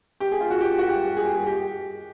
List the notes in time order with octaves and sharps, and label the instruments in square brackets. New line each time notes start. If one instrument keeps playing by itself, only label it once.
[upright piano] G4
G#4
F4
F#4
G4
F#4
G4
G#4
G4
G#4
G4